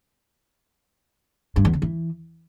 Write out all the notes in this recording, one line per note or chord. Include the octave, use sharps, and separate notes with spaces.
G2
E2
C#3
E3